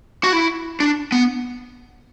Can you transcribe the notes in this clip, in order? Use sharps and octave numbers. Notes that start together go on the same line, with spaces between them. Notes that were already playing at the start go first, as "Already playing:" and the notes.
F#4
E4
D4
B3